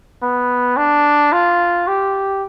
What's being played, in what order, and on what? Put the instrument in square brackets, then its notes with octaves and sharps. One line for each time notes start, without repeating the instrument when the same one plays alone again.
[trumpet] B3
D4
F4
G4